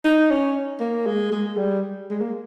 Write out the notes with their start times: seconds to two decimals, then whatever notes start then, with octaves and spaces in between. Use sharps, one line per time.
0.05 D#4
0.31 C#4
0.80 A#3
1.06 G#3
1.32 G#3
1.57 G3
2.10 G#3
2.21 A#3